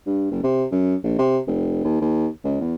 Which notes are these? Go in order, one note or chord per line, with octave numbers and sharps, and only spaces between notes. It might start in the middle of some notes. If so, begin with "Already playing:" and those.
G2
F#1
C3
F#2
A#1
C3
F1
D#2
D#2
C#2
E2